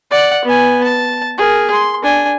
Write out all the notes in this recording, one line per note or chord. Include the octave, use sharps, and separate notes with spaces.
D5 F#5
B3 G#5
A5
G#4 A#4
C6
D4 G#5